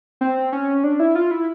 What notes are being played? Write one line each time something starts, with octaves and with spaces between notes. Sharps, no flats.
C4
C#4
D4
E4
F4
E4